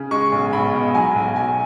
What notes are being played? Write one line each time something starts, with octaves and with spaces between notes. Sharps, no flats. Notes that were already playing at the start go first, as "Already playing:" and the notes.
Already playing: C#3
G#3 C#6
B1
B1 B5
B2
F#3 G#5
B1
B1 G#5